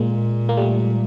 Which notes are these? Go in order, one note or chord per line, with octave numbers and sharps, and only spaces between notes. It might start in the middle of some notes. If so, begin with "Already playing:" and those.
Already playing: A#2 G#3 A#3
A#3
G3 A3